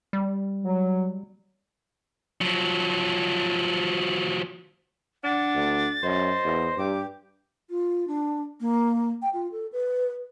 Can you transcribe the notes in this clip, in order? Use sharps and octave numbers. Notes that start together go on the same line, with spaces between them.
G3
F#3
F3 F#3
D4 F#5 A6
D2
F#2 C5 D#5
E2
G2 G4 D6
F4
D4
A#3
G5
F4
A4
B4